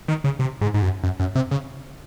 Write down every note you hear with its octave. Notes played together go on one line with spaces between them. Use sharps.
D#3
C#3
C3
G#2
G#2
F#2
F#2
F#2
C3
C#3